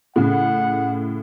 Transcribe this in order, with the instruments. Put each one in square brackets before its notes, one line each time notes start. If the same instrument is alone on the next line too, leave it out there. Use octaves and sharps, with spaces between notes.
[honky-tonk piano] A2 C#3 [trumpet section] F#5